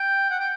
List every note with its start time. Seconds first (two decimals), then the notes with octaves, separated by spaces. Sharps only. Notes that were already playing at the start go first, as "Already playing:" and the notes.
Already playing: G5
0.30 F#5
0.39 G5